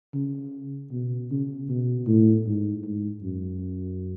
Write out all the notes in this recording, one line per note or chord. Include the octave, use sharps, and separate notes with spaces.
C#3
B2
C#3
B2
A2
G#2
G#2
F#2